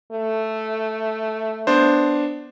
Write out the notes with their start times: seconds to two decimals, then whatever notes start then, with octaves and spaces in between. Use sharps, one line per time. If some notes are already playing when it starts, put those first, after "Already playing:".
0.12 A3
1.67 B3 D4 C5